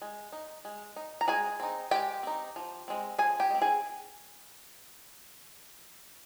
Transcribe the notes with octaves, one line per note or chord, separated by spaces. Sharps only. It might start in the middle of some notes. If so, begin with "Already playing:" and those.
G#3
D#4
G#3
D#4
A#5
G#3 G#4 G#5
C4 D#4
G#3 G4 G5
C4 D#4
F3
G#3 C4
F3 G#4 G#5
G4 G5
G#3 C4
G#4 G#5